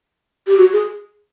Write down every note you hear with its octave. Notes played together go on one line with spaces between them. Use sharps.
G4
F#4
G#4